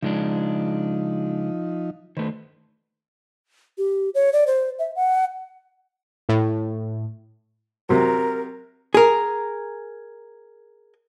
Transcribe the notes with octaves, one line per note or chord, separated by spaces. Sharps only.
C#3 F3 G#3 D4 D#4
D#3 A3 B4 C5
G4
C#5
D5
C5
E5
F#5
A2
C3 F#3 A#4
G#4 A#4